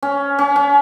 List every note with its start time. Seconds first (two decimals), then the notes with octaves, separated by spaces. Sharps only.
0.03 C#4
0.39 C#4
0.56 C#4